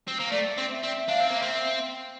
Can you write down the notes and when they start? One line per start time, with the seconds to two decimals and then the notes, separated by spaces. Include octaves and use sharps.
0.08 C4
0.20 A#3
0.31 A3 D5
0.57 C4
0.71 E5
0.83 C4
1.08 D4 F5
1.20 C4
1.30 A#3 E5
1.42 C4